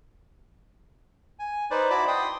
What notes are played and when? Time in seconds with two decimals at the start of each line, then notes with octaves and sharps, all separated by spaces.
1.39 G#5
1.71 D#4 B4 C5 D5
1.90 E4 F#4 D5 A5 B5 D6
2.07 G5 C6 D#6